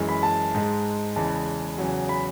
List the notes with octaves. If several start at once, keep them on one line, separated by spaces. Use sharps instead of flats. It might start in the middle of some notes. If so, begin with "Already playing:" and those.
Already playing: F#2 E3 G#3
B5
A5
G#2 G#3
E2 C#3 E3 G#3 A5
E2 C#3 F#3
B5